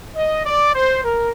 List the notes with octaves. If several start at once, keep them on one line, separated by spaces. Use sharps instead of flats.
D#5
D5
C5
A#4